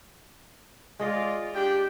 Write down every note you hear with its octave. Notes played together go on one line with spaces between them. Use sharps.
G#3 F4 D5 D#5 F5
D4 G4 G5